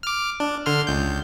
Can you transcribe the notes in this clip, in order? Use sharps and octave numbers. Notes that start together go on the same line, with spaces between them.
D6 F6
D4
D3 C6 F6
C#2 G6